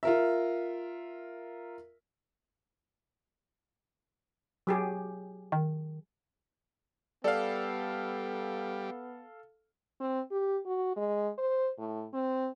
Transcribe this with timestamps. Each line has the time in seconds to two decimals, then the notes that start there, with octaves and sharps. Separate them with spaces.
0.03 F4 A#4 E5
4.67 F#3 G4 G#4
5.52 D#3
7.24 G3 B3 A4 D5 F5
10.00 C4
10.31 G4
10.66 F#4
10.96 G#3
11.38 C5
11.78 A2
12.14 C4